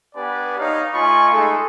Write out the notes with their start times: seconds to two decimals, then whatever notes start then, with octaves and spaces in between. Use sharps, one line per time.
0.15 B3 D4 G4 B4 D5 G#5
0.59 D#4 C#5 F5
0.93 A3 F4 D#5 G#5 B5 C#6
1.32 G#3 A3 D#4 G#4 A4